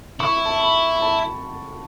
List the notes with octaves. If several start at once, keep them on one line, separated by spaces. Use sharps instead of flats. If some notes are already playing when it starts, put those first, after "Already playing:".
E4 C#6
B5
A5
B5
B5
A5